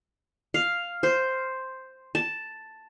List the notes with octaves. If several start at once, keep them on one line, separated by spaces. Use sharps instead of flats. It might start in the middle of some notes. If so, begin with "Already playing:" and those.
F5
C5
A5